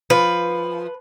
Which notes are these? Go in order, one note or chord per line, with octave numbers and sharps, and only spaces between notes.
F3 B4